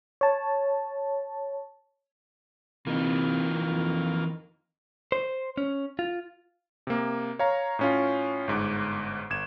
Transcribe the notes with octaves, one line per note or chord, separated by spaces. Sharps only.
C#5 A5
C3 E3 A#3 D#4 F4
F2
C5
C#4
F4
C3 A#3
C#5 F5 A#5
A2 C#4 F4
G1 G#2 D6
G1 G#6 E7